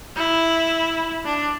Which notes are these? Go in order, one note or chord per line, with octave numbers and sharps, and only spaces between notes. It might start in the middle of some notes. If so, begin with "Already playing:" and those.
E4
D4